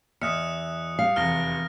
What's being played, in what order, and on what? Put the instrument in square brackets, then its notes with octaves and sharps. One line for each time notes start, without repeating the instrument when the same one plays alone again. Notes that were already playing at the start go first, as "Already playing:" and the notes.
[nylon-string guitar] E2 [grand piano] D#5 E5 F6 [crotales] D#6 F#6 C#7
[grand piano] G3 [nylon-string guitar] F5
[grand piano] F1 E2 G7 [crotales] F6 A#6